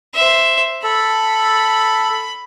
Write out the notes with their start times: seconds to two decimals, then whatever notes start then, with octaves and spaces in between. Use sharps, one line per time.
0.14 C5 E5
0.83 A4 B5